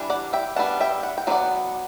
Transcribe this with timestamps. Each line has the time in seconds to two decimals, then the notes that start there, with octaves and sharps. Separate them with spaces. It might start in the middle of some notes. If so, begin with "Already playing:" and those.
Already playing: E3 G3 D4
0.10 D5 F#5
0.33 E5 G5
0.56 G3 B3 D4 F#5 A5
0.80 E5 G5
1.03 F#5
1.18 G5
1.27 F#3 B3 D4
1.31 D5 F#5